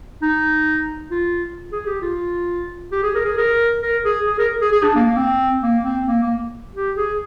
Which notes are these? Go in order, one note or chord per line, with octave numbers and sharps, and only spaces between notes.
D#4
F4
G#4
G4
F4
G4
G#4
A#4
G#4
A#4
A#4
G#4
G#4
A#4
G#4
G#4
D4
A#3
A#3
C4
A#3
C4
A#3
A#3
G4
G#4